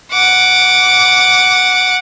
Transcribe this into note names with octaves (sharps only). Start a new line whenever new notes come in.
F#5 D6